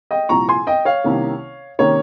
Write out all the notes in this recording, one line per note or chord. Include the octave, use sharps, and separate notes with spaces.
D#5 G5
C2 A#2 F3 A#5 C#6
G#5 C6
D#5 G5
C#5 F5
C2 C3 D#3 A#3 C#4
C3 D#3 A#3 C#4 C#5